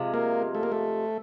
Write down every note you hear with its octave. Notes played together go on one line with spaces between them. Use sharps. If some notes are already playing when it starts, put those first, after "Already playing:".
Already playing: C3 F3 G#3
A#3
A3
A#3
A3